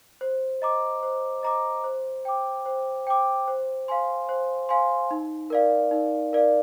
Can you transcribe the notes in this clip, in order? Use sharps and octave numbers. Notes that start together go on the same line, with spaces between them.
C5
D#5 A#5 D6
C5
D#5 A#5 D6
C5
G5 D6
C5
G5 D6
C5
F5 G#5 C6
C5
F5 G#5 C6
D#4
A#4 D5 F5
D#4
A#4 D5 F5